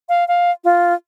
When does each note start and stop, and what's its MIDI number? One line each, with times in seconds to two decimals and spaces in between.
0.09 0.27 77
0.28 0.51 77
0.64 0.93 65